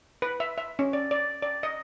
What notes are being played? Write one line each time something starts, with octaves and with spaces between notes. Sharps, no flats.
B4
E5
E5
C#4
D5
D5
D5
D#5